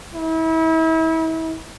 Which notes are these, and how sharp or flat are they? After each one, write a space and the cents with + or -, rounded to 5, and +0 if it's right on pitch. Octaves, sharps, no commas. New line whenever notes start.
E4 -35